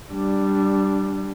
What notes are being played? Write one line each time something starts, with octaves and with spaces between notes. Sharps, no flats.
G3 D4